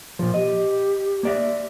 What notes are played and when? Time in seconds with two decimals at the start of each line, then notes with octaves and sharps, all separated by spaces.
0.19 A#2 F3
0.34 G4 D#5
1.23 A#3 D5 E5